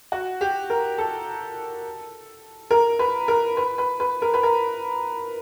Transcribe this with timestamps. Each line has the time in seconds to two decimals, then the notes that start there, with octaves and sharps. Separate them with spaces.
0.12 F#4
0.41 G4
0.70 A#4
0.98 A4
2.71 A#4
2.99 B4
3.28 A#4
3.57 B4
3.78 B4
4.00 B4
4.22 A#4
4.34 B4
4.43 A#4